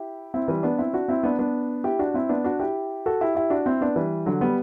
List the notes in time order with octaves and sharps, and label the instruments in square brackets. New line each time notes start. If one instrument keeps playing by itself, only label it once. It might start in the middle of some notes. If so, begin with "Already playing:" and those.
Already playing: [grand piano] E4 G4
C4 E4
E3 G3
B3 D4
C4 E4
D4 F#4
C4 E4
B3 D4
B3 D4
E4 G4
D4 F#4
C4 E4
B3 D4
D4 F#4
E4 G4
F#4 A4
E4 G4
E4 G4
D4 F#4
C4 E4
B3 D4
E3 G3
D3 F#3
G3 B3